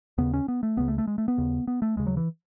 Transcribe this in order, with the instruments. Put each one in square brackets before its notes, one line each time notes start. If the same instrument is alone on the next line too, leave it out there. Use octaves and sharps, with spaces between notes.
[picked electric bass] D#2 C#3 B3
C#4
B3
A3
C#2 C#3 B3
A3
A3
G#3
A3
B3
D#2 C#3
B3
A3
D#2 C#3 G#3
F#3
E3